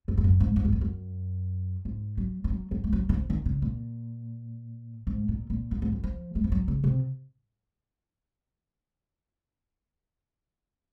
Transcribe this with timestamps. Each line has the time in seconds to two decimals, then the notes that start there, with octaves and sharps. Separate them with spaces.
0.08 F#2
0.17 F2
0.24 F#2
0.40 G#2
0.56 G#2
0.65 F#2
0.72 F2
0.81 F#2
1.85 G#2
2.17 F#3
2.44 F3
2.50 F#3
2.71 F#3
2.84 G#3
2.93 F#3
3.09 D#3
3.14 F3
3.30 D#3
3.46 C#3
3.62 A#2
5.07 G#2
5.28 A#2
5.50 A#2
5.71 F#2
5.82 G#2
5.92 F#2
6.04 F3
6.35 G#3
6.44 F3
6.52 F#3
6.68 C#3
6.84 C3